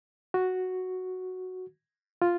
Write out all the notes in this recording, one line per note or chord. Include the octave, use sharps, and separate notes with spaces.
F#4
F4